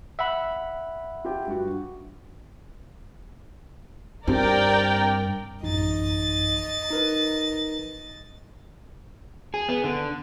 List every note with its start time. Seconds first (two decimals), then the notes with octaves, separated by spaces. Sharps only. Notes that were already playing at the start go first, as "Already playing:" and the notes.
0.19 E5 F#5 B5
1.25 F4 G4 G5
1.48 G2 F#4
4.27 G2 C4 D4 G4 A#4 D5 G5
5.63 A1 F#2 D#4 D#5 A6
6.91 D#4 A#4 B4
9.54 G#4
9.69 B3
9.84 D3